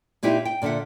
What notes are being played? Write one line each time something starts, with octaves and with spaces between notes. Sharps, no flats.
A#2 C4 D#4 E4 G4
G5
A#2 D3 F4 E5 F#5